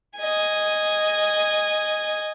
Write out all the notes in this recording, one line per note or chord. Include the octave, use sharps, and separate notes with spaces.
D#5 G#5